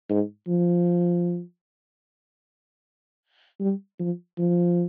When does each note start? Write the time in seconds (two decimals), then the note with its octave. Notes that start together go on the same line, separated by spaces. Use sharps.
0.09 G#2
0.48 F3
3.60 G3
3.99 F3
4.38 F3